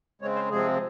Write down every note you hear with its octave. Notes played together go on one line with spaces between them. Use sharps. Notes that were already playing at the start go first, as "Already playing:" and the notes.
C#3 G#3 C4 C#5
C5
C3 F3 G#3 C4 G#4